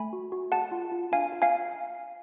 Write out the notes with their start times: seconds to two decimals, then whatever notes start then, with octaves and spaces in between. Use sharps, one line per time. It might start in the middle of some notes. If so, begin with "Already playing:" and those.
Already playing: A3 G#5 B5
0.13 F#4
0.32 F#4
0.52 G#4 F#5 A5
0.72 F4
0.92 F4
1.12 D4 F5 G#5
1.32 F4
1.42 F5 G#5